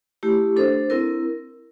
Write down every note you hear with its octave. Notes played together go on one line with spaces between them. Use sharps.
A3 E4 G4
D4 A4 C5
C4 E4 A#4